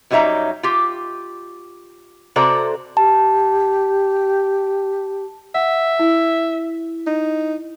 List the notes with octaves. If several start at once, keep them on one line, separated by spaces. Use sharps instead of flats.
F#2 F#3 G3 D#4 E5 A#5
F4 G4
C3 F#4 A4 C5 D5 A#5
G4 A5
E5 F#5
E4
D#4